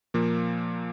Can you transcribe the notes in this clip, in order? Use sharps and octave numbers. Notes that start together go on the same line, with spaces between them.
A#2 F3 A#3